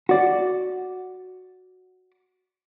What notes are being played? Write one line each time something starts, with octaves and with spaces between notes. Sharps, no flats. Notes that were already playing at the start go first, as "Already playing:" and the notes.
F#4 D5